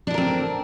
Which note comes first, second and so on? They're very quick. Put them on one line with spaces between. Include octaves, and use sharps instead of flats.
D4 E4 A#4 C4